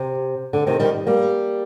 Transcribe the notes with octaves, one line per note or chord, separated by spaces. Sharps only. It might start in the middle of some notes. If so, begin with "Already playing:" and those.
Already playing: C3
D3
C3 D#3
D#3 G3
G3 A#3